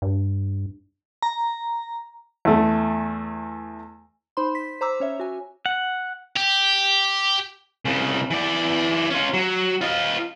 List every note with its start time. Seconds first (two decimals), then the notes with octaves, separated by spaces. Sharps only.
0.02 G2
1.22 A#5
2.45 E2 A3
4.37 D#4 C5 B5 C6
4.55 B6
4.81 C5 A#5 D6 E6
5.00 C#4 C#5 E5
5.20 F#4 G#5
5.66 F#5
6.36 G4
7.85 C2 C#3
8.31 E3 D5
9.10 C#4 F4
9.34 F#3
9.81 F4 D#5